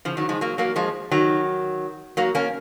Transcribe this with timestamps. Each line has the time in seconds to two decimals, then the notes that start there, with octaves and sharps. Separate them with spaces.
0.05 C#3 F3
0.17 D#3 F#3
0.29 F3 G#3
0.41 F#3 A#3
0.58 F#3 A#3
0.76 F3 G#3
1.11 D#3 F#3
2.17 F#3 A#3
2.35 A#3 C#4